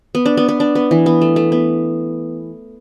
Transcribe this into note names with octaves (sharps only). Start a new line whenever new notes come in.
B3
D4
B3
B3
D4
B3
E3
B3
A3
A3
B3